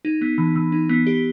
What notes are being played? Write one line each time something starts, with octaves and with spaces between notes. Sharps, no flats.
D#4
B3
E3
E3
D#4
B3
G4